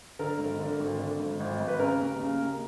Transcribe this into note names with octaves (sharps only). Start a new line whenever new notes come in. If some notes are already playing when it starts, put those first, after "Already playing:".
D3 A#4
G#1
D3
G#1
D3
G#1
G#1
G#1
B4
C#3 A#4
D#2
C#3
D#2